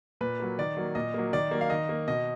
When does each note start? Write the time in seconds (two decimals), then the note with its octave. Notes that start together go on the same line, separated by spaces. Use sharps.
0.21 A#2 B4
0.40 F#3 A#3
0.58 D#3 D5
0.77 F#3 A#3
0.95 A#2 D#5
1.14 F#3 A#3
1.33 D#3 D5
1.51 F#3 A#3
1.61 F5
1.70 D#3 D#5
1.89 A#3
2.08 B2 D#5